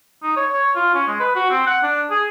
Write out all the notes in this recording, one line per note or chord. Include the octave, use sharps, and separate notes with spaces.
D#4
C#5
C#5
F4
C#4
G#3
B4
F#4
C4
F#5
D4
G#4